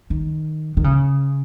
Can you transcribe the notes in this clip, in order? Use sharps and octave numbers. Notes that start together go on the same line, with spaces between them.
D#3
D#3
C#3